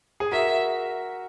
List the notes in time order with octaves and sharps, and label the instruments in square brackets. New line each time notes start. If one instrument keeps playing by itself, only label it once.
[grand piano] G#4
[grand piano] F#4 A#4 [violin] E5